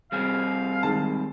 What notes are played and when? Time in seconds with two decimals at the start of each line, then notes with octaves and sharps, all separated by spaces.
0.12 G3 C4 G#4 F5
0.83 D#3 G#3 A5